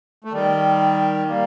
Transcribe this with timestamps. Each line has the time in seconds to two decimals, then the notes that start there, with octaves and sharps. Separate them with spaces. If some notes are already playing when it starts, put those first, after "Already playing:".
0.24 A3
0.32 D#3 G3
1.28 G3 A#3